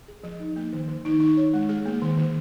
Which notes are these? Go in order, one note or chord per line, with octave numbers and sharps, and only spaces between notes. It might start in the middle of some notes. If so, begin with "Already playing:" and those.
G#4
F3
D#4
A#3
D#3
D#3
D#4
D#4
C#5
G#3
G#4
A#3
D#3
D#3